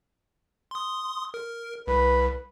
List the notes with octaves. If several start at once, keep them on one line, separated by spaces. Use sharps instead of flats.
C6 D#6
A#4
C2 B4